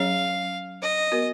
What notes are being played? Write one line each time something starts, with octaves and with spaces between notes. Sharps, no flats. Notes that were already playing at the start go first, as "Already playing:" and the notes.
Already playing: F#3 C#4 G#4 C#5 F5
D#5
B3 F#4 A#4